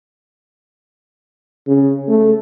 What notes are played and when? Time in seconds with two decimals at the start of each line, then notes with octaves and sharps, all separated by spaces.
1.67 C#3
2.08 A3